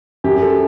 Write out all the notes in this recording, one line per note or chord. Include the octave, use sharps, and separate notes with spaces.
F#2 G4
A4